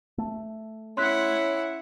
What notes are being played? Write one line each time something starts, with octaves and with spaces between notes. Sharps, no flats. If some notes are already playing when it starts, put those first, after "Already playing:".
A3
C#4 E4 F#5 C6 F#6 B6